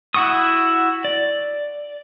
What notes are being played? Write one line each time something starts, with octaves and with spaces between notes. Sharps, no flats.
E4 F#4 F#5 C#6 D#6
D5